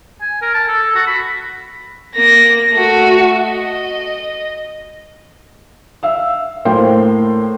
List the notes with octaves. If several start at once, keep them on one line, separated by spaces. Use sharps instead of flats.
G#5
A#4
A5
A4
F#4
B5
A#3 A#6
A3 F#4
D#5
E5 F5 E6
A2 A#3 C5 F5 G5 C6